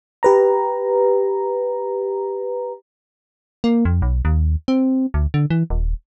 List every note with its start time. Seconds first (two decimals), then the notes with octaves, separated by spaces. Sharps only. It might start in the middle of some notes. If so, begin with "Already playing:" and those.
0.23 G4 B4 A#5
3.64 A#3
3.85 F2
4.02 B1
4.25 D#2
4.68 C4
5.14 D2
5.34 D3
5.50 E3
5.70 D#1